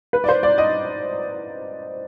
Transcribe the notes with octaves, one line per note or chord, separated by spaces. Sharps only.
B4
D5
C5
D5
D#5